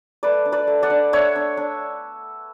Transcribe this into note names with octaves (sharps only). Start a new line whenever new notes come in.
A3 B4 D5
D4
B4 D5
A3
D5 F#5
D4
D4 C#5 E5
D4
D4